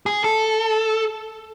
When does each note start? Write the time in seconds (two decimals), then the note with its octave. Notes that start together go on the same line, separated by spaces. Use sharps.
0.06 G#4
0.24 A4